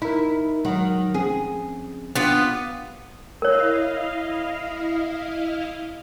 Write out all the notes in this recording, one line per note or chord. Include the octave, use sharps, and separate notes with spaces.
D#4 E4 A#4
D#3 F#3 G#3 F#5
F3 C4 C#4 G#4
B3 D4 F4 G4
E4 A#4 C#5 D#5 F5